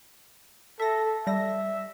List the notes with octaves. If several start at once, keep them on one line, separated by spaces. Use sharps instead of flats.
A4 E5 A#6
G3 E5 A#6